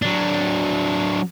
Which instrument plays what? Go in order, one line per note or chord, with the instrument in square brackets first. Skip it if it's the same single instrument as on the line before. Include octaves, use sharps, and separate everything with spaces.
[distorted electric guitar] F#3 D4